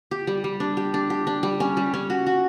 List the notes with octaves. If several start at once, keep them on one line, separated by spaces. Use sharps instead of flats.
G4
G3
G3
D4
G4
D4
G4
D4
G3
C#4
G3
C#4
F#4
F#4